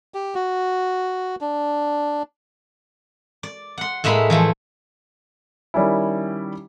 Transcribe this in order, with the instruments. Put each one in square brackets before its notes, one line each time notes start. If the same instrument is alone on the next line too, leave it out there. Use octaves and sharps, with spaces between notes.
[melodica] G4
F#4
D4
[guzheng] D5
F#5 C6
A2 G#3 A#3 E5 B5
E3 F3 A3
[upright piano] D#3 G3 C#4 E4